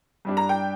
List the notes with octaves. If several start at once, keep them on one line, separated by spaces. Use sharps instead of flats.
G2 G3 D4
A#5
G5